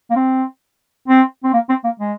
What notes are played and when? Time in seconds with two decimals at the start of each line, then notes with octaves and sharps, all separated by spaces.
0.11 A#3
0.16 C4
1.08 C4
1.44 C4
1.53 A#3
1.69 C4
1.84 A#3
1.99 G#3